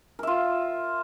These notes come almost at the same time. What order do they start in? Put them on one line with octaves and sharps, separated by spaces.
A#4 E5 F4